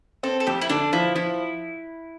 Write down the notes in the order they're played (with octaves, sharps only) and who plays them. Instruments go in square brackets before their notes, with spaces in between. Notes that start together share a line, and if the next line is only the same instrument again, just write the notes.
[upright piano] C4 [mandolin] A4
[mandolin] A4
[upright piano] F2 [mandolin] G4
[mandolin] E4
[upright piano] D3 [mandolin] D4
[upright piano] F3 [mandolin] E4
[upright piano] F3 [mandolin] E4